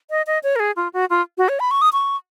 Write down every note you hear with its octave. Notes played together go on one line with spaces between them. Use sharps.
D#5
D#5
C#5
A#4
G#4
F4
F#4
F4
F#4
C#5
B5
C#6
D#6
C#6